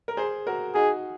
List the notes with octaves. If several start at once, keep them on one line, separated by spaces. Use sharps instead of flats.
A#4
G#4 C5
F#4 A#4
D#4 F#4 G#4